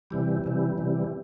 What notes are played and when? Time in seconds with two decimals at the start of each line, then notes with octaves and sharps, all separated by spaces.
0.11 C3 E3 G3
0.44 C3 E3 G3
0.78 C3 E3 G3